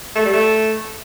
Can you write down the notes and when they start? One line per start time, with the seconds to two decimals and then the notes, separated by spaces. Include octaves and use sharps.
0.16 A3
0.25 G3
0.33 A3